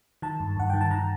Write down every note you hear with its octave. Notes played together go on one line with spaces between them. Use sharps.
D#3 A5
G2
G2 F#5
D#3 G5
A5
D#3 A#5